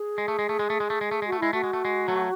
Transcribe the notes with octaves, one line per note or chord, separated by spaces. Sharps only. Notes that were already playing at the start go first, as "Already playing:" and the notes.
Already playing: G#4
G#3
A3
G#3
A3
G#3
A3
G#3
A3
G#3
A3
G#3
F#4
A3
G#3 E4
A3 F#4
G#3
A3
G#3
F#3 A3